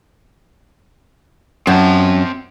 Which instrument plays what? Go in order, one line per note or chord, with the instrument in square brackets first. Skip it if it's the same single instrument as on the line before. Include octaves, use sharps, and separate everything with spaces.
[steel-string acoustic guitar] F#2 [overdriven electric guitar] C4 A5